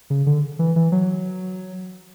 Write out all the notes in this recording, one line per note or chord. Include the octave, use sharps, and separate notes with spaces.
C#3
D3
E3
E3
F#3